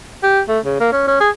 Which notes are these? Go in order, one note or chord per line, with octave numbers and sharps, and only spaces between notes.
G4
A3
C#3
A#3
C#4
C#4
G#4